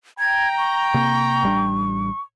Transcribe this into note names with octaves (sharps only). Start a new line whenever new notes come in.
G5 A#5 G#6
C#6
C3 A#3
A1 G3 D4